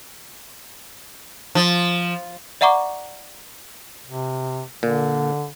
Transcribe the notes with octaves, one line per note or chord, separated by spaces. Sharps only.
F3
D5 E5 F#5 A#5 C#6 D6
C3
A#2 D3